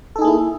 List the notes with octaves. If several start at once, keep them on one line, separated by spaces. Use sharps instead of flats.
A#3 D#4 E4 G#4 A4